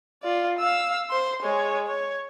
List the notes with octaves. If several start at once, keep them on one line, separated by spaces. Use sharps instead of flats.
F4 D5
F5 E6
C5 C6
G#3 C#5
C#5